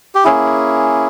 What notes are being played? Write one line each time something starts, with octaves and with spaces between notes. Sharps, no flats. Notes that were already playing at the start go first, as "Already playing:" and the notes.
G4
A#3 C#4 E4 G#4